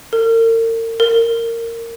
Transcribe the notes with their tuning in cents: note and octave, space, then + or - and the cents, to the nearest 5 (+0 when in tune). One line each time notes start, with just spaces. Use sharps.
A#4 -40
A#4 -15